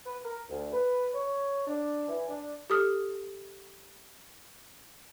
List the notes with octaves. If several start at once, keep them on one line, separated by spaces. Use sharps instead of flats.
B4
A#4
D2
B4
C#5
D4
E3
D4
G4 A4 D#6 F6